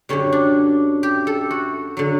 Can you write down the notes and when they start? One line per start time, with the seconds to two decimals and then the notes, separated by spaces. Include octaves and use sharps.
0.09 F#2 D3 G3 C#4
0.32 D4
1.03 G4
1.27 A4
1.51 F#4
1.97 D3 F#3